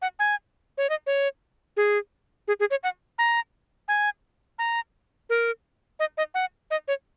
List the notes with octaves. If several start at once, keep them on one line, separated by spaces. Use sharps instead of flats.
F#5
G#5
C#5
D#5
C#5
G#4
G#4
G#4
C#5
F#5
A#5
G#5
A#5
A#4
D#5
D#5
F#5
D#5
C#5